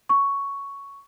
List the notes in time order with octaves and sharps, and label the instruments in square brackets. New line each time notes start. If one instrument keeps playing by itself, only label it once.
[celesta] C#6